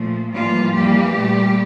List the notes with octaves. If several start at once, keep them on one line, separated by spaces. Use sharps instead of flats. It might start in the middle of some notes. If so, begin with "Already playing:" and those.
Already playing: A#2 F3 A3
A2 E3 F3 G3 A#3 F4
F2 E3 G3 A#3 G4
A#2 A3